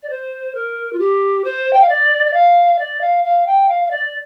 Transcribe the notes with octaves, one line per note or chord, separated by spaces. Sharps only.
D5
C5
A#4
F4
G4
C5
G5
F5
D5
D5
F5
D5
F5
F5
G5
F5
F5
D5